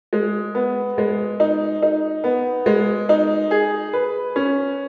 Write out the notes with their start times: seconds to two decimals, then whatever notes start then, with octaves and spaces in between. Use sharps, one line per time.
0.13 G#3
0.55 B3
0.98 G#3
1.40 D#4
1.82 D#4
2.24 B3
2.66 G#3
3.09 D#4
3.51 G#4
3.93 B4
4.36 C#4